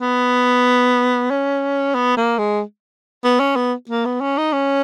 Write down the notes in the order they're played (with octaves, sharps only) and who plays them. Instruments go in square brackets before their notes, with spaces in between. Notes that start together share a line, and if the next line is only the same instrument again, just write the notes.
[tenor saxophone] B3
C#4
B3
A#3
G#3
B3
C#4
B3
A#3
B3
C#4
D#4
C#4